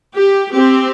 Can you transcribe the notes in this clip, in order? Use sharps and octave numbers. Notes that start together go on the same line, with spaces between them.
G4
C4 G4